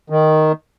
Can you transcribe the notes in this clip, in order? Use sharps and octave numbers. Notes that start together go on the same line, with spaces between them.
D#3